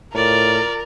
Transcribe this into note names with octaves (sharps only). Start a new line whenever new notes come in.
A2 F4 A#4 D5